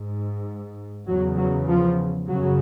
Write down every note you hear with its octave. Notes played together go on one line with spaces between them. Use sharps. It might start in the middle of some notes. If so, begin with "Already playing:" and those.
Already playing: G#2
E2 C#3 F#3
F#3
F3
F#2 C#3 F#3